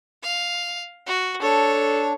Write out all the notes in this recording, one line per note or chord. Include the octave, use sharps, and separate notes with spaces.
F5
F#4
D4 A4 C#5